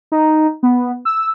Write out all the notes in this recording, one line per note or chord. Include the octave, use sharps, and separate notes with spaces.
D#4
B3
E6